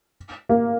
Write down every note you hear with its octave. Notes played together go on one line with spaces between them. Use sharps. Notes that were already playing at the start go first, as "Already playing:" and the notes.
A#3